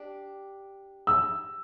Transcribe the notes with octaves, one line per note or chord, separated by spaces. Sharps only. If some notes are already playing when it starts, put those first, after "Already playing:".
Already playing: D4 G4
E6